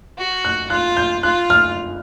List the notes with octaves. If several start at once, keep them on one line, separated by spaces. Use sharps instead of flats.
F#4
F#6
F4 F#6
G6
F4 F#6
F6